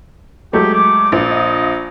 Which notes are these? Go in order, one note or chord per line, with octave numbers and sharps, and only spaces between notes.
F#3 G#3 A3 G4
D6
A#1
D#5